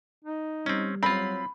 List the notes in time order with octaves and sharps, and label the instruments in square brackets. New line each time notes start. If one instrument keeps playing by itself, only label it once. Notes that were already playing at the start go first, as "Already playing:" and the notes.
[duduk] D#4
[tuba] G3 [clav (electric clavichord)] C4 C#4
[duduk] F#3 [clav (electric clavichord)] C4 F4 [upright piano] B5